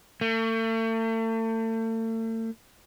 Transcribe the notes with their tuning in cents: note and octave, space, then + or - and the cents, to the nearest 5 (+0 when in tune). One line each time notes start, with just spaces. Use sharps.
A3 +40